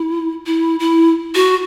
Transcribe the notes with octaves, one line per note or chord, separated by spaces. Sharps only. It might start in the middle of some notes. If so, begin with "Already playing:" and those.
Already playing: E4
E4
E4
F#4